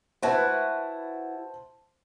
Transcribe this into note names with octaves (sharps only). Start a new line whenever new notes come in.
E4 F#4 B4 C5 A5